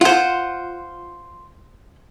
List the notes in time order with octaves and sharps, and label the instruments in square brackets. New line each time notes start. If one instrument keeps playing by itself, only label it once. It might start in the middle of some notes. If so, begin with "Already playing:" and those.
[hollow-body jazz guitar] F4 [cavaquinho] C5 F#5